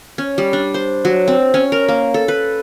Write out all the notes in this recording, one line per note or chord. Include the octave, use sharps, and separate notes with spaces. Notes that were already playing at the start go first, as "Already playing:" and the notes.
C#4
G3
D4
C5
F#3
C4
C#4
A#4
A#3
A4
B4